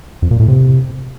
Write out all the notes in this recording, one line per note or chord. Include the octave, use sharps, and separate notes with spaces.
F2
A#2
A2
C3